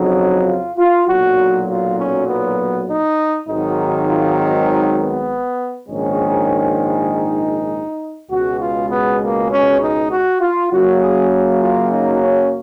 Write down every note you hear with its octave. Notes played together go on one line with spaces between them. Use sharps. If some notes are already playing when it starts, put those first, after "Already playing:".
Already playing: F2 C#3 F#3 D#4
F4
F4
B1 A#2 F#3 F#4
F4
C#4
B3
D#4
G#1 G#2 D#3 F#3 D#4
F4
D#4
B3
A#1 G#2 D#3 G#3 C#4
D#4
C#2 B2 G#3 F#4
F4
B3
A#3
C#4
D#4
F#4
F4
F#2 C#3 F#3 A#3 F#4
G#4
F4
D#4
C#4